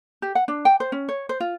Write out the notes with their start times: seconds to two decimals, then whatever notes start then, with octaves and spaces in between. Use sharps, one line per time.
0.22 G4
0.35 F#5
0.48 D4
0.65 G5
0.80 C5
0.92 C#4
1.09 C#5
1.29 C5
1.40 F4